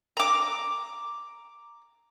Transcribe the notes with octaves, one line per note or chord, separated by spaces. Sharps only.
A#5 D6